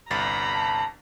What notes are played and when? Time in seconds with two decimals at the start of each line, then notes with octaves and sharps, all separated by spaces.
0.11 G1 C2 A#5 B5 A6
0.54 A5